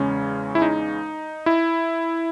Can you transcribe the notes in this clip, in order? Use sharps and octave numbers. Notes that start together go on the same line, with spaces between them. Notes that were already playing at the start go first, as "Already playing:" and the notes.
Already playing: E2 C#3 G#3 C#4
E4
D#4
E4